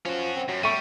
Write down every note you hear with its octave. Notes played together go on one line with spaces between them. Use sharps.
F3 C#4 F#4
C4
F#2 F#3
G3 A3 C#6 D#7